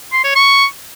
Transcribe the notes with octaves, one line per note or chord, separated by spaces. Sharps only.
C6
C#5
C#6